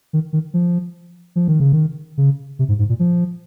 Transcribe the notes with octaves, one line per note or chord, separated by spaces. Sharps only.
D#3
D#3
F3
F3
D#3
C#3
D#3
C#3
C3
G#2
G#2
A#2
F3